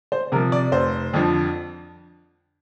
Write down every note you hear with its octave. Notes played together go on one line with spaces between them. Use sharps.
C5
C3 F3 A#4
D5
F1 C5
F2 D3 F3